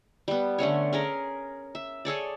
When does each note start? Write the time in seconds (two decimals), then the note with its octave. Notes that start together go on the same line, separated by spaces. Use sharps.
0.28 G3 B3
0.58 D3 A3 C#4 C#5
0.93 C#4 G#4 A#4
1.75 E5
2.05 G#4 A4 C#5 D5